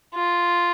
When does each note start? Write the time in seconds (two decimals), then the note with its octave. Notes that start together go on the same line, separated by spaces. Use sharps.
0.15 F4